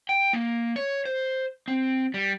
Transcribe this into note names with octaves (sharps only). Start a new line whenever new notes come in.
G5
A#3
C#5
C5
C4
G3